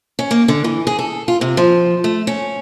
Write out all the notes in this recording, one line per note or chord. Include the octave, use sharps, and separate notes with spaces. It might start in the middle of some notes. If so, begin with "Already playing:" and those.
C#4
A#3
D3
E3
G#4
A4
F4
C3
F3
A3
C#4